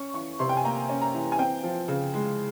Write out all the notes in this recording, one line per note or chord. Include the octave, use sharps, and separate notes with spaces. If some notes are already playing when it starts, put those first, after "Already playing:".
Already playing: C#4 C#6
E3 C#6
C3 C6
G5
G#5
A#3 A#5
C#4
A#5
E3
G#5
C4 G5
F3
C#3
G#3